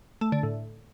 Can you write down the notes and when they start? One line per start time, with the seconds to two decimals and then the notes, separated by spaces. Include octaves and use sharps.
0.21 A3
0.32 D3
0.43 A2